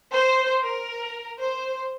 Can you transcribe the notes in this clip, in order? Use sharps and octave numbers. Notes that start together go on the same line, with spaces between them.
C5
A#4
C5